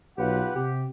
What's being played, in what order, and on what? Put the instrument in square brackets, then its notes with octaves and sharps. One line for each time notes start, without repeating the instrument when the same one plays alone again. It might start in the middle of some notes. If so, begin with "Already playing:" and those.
[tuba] B1 [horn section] F4 G4 B4 [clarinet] F#5
[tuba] C3 [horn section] G4